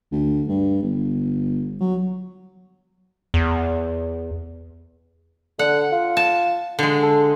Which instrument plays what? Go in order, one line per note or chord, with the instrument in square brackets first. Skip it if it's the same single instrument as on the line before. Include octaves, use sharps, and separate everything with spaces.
[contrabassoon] D2
G2
G1
F#3
[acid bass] E2
[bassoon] D3 [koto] F#5
[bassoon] F4
[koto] A5
D3 G#3
[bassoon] A4